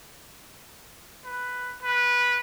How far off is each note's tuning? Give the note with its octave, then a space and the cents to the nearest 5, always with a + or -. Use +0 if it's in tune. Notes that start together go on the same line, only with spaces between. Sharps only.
B4 +5
B4 -15